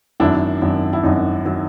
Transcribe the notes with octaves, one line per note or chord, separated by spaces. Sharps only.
G#1 F#2 D#3 F#3 D4 E4
G#1 F#2 D#3 F#3
E4
G#1 F#2 D#3 F#3 D#4
D#3 F#3